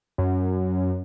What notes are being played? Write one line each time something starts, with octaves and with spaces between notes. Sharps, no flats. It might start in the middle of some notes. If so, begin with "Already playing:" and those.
F#2